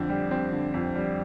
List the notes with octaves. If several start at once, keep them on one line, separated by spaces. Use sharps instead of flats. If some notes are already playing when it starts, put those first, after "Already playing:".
Already playing: F2 D3 C4
G3
C4
D3
F2
G3